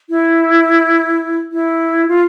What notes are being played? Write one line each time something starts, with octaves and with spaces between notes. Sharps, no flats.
E4
E4
F4